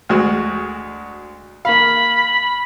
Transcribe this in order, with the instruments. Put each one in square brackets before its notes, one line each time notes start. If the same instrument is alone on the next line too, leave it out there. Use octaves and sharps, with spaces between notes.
[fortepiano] D2 G#3 F#4
[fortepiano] A#3 F5 [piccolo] B5